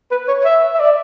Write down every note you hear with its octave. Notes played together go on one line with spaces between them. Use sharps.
B4
C#5
E5
E5
D5